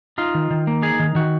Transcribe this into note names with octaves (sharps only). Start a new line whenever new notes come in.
D#4 F4
D#3
D#3
A#3
D#4 G#4
D#3
D#3 F#4